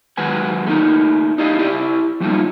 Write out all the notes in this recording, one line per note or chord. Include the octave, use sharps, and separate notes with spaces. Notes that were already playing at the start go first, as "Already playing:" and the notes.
D#3 F#3 G#3 B4 F#5 G#5
A3 A#3 D#4 A#4
D#4 E4 G4 D5 D#5 F5
E4 G4 D5
F3 G3 A3 A#3 D#4 F4